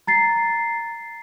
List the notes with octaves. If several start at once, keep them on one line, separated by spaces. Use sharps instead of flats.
A#5 A6 C7